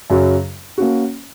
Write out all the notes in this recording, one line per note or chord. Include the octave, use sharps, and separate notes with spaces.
F#2 C#3 F#3
A#3 C#4 F#4